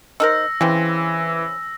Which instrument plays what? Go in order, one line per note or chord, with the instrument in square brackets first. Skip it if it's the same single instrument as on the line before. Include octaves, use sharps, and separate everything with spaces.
[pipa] D#4 A#4 C5 [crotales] E6 A#6
[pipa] C#3 C4 [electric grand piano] E3